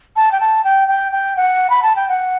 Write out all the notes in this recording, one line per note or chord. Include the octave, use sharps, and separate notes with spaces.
A5
G5
A5
G5
G5
G5
F#5
B5
A5
G5
F#5